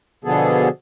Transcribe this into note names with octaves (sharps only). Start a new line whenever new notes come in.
B2 D3 F3 B3 G#4 A4